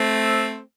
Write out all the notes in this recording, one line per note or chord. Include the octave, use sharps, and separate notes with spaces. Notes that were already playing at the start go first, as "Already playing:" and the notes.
Already playing: A3 C4